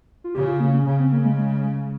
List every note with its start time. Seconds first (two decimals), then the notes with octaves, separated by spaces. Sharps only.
0.24 F4
0.35 C#3 G4
0.47 F4
0.60 A#3
0.74 C#4
0.86 C#3
0.99 C4
1.12 A#3
1.25 G#3
1.38 G#3
1.64 G#3